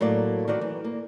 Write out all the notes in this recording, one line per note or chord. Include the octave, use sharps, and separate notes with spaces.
A2 F#3 A#3 D5
D#3 F#4 D5
E3
A#3